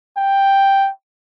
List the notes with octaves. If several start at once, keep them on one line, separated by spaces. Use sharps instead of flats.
G5